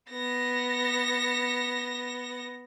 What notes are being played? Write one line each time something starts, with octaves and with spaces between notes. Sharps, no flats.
B3 A#6